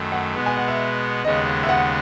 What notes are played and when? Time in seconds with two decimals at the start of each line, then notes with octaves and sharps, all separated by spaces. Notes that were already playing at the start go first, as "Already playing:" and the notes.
Already playing: F#2 D#3 A3
0.12 F#5
0.34 B2 G#3 B3
0.46 G#5
0.57 F#5
0.68 E5
1.24 D#2 C#3 G#3 B3 D#5
1.63 E5
1.69 F#5